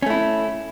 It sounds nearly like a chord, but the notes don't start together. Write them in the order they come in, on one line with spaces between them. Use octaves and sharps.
C#4 A3 E4